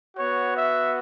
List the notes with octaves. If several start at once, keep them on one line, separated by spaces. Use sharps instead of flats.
B3 F#4 C#5
E5